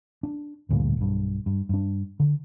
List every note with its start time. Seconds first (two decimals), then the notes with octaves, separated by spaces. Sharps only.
0.23 D4
0.69 A1 D2 G2 A#2
0.97 B1 G2
1.46 G2
1.69 G2 D4
2.20 D3